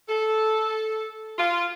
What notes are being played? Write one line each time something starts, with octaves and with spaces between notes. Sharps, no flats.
A4
F4